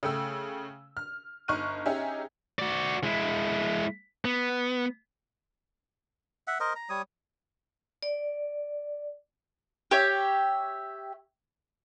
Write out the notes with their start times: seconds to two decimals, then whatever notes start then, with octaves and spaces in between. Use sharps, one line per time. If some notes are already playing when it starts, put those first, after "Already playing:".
0.03 C#3 A3 G5 E6
0.97 F6
1.48 G1 D#4 C#6 F6 F#6 D#7
1.86 C#4 D#4 G4 G#4 E5
2.59 F#4 D5
3.04 G#3 E4
4.25 B3
6.47 E5 F#5
6.60 A#4 C5 D#5
6.75 A#5
6.89 G3 C#5 D#6
8.03 D5
9.91 G4 C#5 E5